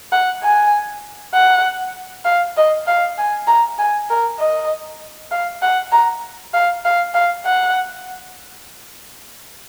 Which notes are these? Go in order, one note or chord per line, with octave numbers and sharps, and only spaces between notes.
F#5
G#5
F#5
F5
D#5
F5
G#5
A#5
G#5
A#4
D#5
F5
F#5
A#5
F5
F5
F5
F#5